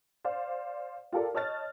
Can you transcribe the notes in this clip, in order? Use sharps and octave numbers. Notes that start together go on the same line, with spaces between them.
C5 D5 F5
F4 G4 A4 A#4 D5
C#5 D#5 A5 F6 F#6 A6